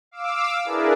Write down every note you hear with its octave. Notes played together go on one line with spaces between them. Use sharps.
F5 D6 E6
D4 E4 G#4 A#4 B4 D5